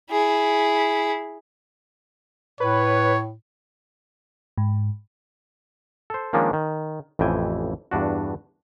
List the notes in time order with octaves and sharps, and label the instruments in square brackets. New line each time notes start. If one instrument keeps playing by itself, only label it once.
[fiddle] E4 G#4
[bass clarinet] A2 [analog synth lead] B4 [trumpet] C#5
[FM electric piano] G#2
[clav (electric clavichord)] A4 C5
D#3 F3 G#3 A#3 C#4 D4
D#3
A1 F2 E3 G5 G#5
E2 G2 D4 F#4